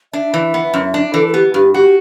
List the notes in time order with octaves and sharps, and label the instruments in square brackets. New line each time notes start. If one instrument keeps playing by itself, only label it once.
[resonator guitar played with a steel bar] D4 [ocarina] E5
[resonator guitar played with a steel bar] E3
B3
F#2
D4
[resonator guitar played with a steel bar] E3 [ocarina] A4
[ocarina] A4
[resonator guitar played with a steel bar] B3 [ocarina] G4
[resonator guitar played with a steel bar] G2 [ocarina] G4
[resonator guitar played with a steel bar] F#4 [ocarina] G4